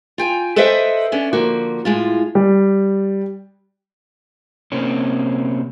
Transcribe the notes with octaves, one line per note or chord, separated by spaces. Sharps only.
F4 G5 G#5
A4 B4 C5 D#5 E5 G5
B3 C#4 D4
D3 F3 A#3 F#4
A2 G#3 F4
G3
C3 A#3 C4 C#4